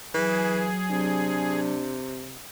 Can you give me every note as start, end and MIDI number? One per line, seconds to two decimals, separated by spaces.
0.14 0.70 52
0.14 1.72 54
0.14 1.60 68
0.91 2.43 48
0.91 2.03 62